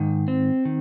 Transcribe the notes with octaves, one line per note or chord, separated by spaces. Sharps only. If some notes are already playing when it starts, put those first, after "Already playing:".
Already playing: G#2 D#3
C4
D#3